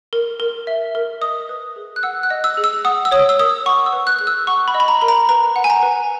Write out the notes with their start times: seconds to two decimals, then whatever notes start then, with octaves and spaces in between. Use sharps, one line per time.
0.13 A#4
0.40 A#4
0.67 E5
0.95 A#4
1.21 D#5 D#6
1.49 B4
1.76 G#4
1.96 F#6
2.03 F#5 E6
2.23 F#6
2.30 D#5
2.44 E6
2.57 G#4
2.64 E6
2.85 F#5 D#6
3.05 E6
3.12 C#5 D#6
3.29 E6
3.39 A#4 D#6
3.66 F#5 C#6
3.86 E6
3.93 B4
4.07 F#6
4.19 G#4 F#6
4.27 E6
4.47 F#5 C#6
4.68 B5
4.74 D#5
4.80 B5
4.88 A#5
5.01 A#4 B5
5.08 A#5
5.29 B4 A#5
5.56 F#5
5.64 G#5
5.70 A#5
5.83 B4